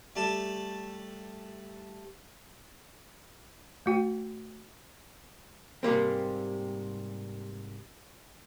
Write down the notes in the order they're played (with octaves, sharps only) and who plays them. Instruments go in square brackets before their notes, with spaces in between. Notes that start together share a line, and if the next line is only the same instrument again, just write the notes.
[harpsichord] G3 A3 A4 A5
[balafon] A3 F#4 G5
[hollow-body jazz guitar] G#2 C3 G3 A#3 C4